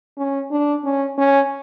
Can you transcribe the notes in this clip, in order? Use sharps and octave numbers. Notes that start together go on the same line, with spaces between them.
C#4
D4
C#4
C#4